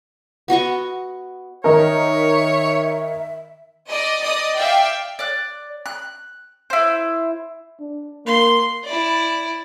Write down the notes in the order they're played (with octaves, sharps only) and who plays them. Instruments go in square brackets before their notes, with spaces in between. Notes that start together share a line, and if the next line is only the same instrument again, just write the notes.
[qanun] B3 F#4 D#5 C#6
[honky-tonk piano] D#3 D#4 A#4 [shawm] C#5 [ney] E5
[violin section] D5 D#5
D5 D#5 D#6
D5 E5 F5 G5
[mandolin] D5 F#6
F#6
E4 C5
[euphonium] D4
[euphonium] A#3 [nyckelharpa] C6
[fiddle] E4 D5